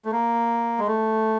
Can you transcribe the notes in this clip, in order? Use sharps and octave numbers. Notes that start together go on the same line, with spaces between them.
A3
A#3
G#3
A3